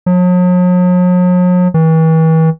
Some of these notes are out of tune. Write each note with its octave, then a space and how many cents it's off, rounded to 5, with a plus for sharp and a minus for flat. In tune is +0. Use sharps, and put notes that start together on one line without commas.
F#3 -45
E3 -40